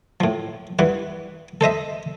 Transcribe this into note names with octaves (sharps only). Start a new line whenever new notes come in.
A2 F3
G2 E3 F#5
A4 C5 D#5 E5